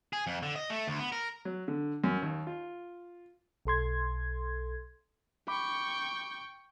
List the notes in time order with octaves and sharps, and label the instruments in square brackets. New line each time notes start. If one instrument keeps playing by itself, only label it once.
[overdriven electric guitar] G#4
F2
D3
D#5
A3
D2
B3
A#4
[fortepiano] F#3
D3
F#2
D#2
F4
[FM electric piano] B1 A4 C6 G#6
[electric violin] G5 C#6 [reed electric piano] B5 D6